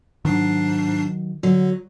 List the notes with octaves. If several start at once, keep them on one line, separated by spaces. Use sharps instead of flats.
G#2 D#3 F#3 D4 C7
D3 F#3